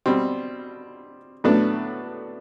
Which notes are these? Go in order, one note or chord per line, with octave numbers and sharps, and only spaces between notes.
B2 G3 C4
A2 F#3 A3 B3 D4